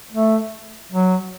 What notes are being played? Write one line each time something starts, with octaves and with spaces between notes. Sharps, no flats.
A3
F#3